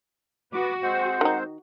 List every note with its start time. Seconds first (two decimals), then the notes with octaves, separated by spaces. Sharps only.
0.53 B3 F#4 B4 D6
0.83 G#3 C4 C5 F#5
1.21 D#3 D#4